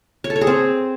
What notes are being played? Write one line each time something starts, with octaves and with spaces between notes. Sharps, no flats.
C#5
A4
C#5
G#4
C4